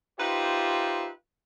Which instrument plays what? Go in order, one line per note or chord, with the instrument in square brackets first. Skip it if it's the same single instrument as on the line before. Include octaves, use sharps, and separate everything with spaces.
[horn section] D#4 F4 G4 B4 C5 E5